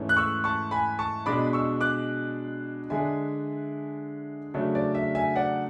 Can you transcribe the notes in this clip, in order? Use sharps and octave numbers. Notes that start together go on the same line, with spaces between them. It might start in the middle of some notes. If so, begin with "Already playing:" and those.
Already playing: G#2 E3 A3 C#4
F#6
C#6 E6
A5 C#6
G#5 B5
A5 C#6
B2 G#3 D4 B5 D6
C#6 E6
D6 F#6
D3 G#3 D4 E5 G#5
C#3 F#3 A3 D4
D5
E5
E5 G#5
D5 F#5